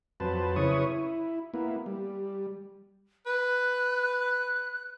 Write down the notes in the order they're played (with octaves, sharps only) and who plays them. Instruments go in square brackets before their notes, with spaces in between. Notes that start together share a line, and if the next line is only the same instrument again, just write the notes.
[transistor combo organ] F2 F#3 B4 C5 A5
C#3 E4 B4 C#5 C#6 D#6
E4
A#3 B3 E4
G3
[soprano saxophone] B4 [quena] F#6